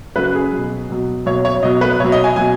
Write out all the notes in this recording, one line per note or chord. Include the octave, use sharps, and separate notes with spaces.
C#3 F#3 B4
G#4
B2 F#3
B2 F#3
B2 F#3 C#5
C#5
B2 F#3 D#5
B4
B2 F#3 C#5
D#5
G#5
B2 F#3 G#5